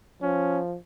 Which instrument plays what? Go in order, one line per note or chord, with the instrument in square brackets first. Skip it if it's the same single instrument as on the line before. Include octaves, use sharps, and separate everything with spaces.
[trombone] F3 [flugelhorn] C#4